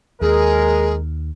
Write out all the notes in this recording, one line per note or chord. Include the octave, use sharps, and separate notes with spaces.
D#2 G#3 G#4 A#4